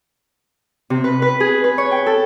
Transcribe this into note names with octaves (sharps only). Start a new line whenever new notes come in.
C3
B4
B4
G#4
B4
C#5
G5
A4